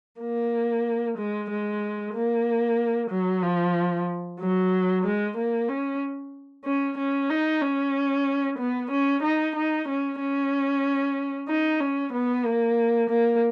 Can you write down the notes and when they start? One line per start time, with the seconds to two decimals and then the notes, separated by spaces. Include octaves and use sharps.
0.21 A#3
1.18 G#3
1.50 G#3
2.14 A#3
3.10 F#3
3.43 F3
4.40 F#3
5.04 G#3
5.37 A#3
5.69 C#4
6.65 C#4
6.98 C#4
7.29 D#4
7.61 C#4
8.59 B3
8.91 C#4
9.23 D#4
9.56 D#4
9.88 C#4
10.19 C#4
11.48 D#4
11.80 C#4
12.13 B3
12.45 A#3
13.10 A#3